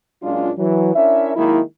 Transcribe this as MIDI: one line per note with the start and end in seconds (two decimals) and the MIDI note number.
0.23 0.51 46
0.23 0.51 54
0.23 0.51 56
0.23 0.51 61
0.23 0.51 62
0.23 0.51 65
0.58 0.91 52
0.58 0.91 54
0.95 1.32 61
0.95 1.32 62
0.95 1.32 64
0.95 1.32 70
0.95 1.32 76
1.36 1.60 51
1.36 1.60 54
1.36 1.60 56
1.36 1.60 58
1.36 1.60 63
1.36 1.60 64